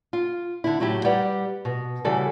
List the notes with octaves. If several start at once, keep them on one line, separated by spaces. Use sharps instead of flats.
F4
D3 E4
A2 F#3 E4 G4
G3 G4 B4 D5 F#5
B2
C#3 E3 G3 F#4 A4